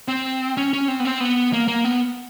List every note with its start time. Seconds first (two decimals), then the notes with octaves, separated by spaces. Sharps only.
0.08 C4
0.57 C#4
0.73 C#4
0.88 C4
1.00 B3
1.05 C4
1.20 B3
1.53 A#3
1.68 A#3
1.84 B3